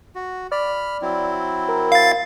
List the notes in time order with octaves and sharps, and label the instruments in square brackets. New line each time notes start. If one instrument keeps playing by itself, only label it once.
[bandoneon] F#4
[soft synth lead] D5 [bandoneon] B5 F6
[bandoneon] F#3 C4 E4
[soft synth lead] A#4
[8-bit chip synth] F5 A6